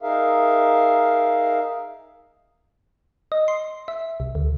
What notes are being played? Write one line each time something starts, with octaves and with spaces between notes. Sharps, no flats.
D#4 G#4 A#4 E5 F5
D#5
C6
E5
C2
D2